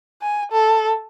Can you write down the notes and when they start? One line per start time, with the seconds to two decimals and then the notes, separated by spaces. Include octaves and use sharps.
0.22 G#5
0.52 A4